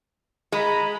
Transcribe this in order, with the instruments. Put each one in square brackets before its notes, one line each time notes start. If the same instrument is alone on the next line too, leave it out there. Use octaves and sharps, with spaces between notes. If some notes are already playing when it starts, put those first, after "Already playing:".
[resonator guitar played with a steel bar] G#3 [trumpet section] A#5 B5